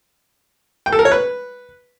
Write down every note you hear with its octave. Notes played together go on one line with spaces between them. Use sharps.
G5
A4
A#4
C#5
B4